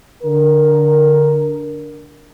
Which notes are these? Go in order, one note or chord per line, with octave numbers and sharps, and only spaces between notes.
D3 A#4